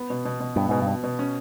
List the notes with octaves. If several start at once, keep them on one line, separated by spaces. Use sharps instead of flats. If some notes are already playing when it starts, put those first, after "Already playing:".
Already playing: B3
B2
B2
B2
G2 B3
G#2 B2
G2
B2
B2
C#4